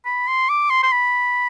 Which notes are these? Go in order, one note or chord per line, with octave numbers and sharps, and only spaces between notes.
B5
C6
D6
C6
C6
B5